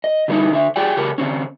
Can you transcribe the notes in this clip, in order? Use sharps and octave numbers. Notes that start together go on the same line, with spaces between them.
D#5
D3 G3 B3 C#4 D#4 E4
D3 E5
F4 G4 G#4 D5 G5
C#3 G4 A4 A#4
D3 C4 C#4